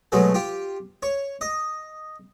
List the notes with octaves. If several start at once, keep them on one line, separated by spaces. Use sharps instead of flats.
B2 F#3 G#3 A3
F4 G4
C#5
D#5